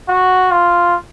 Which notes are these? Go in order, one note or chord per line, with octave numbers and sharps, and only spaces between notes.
F#4
F4